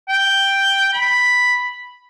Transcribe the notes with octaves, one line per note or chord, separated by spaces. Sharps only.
G5
B5